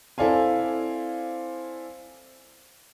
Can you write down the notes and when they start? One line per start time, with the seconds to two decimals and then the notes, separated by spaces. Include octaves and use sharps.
0.18 C4 E4 A4 D5 F5 G#5